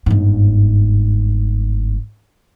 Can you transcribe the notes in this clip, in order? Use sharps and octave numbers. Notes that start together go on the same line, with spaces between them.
G1 G#2